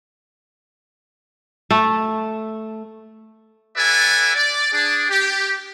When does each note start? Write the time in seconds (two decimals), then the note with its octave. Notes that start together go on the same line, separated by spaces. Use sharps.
1.71 A3
3.77 F#4 A4 B4 D5 E5 G#5
4.36 D5
4.72 D4 G#4 D5
5.10 G4